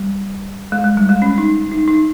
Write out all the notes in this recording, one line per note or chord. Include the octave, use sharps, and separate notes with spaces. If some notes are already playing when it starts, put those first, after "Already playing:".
Already playing: G3
G#3
G#3
G3
G#3
C#4
D#4
D#4
D#4